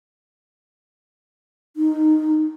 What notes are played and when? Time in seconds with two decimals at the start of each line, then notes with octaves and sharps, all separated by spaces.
1.77 D#4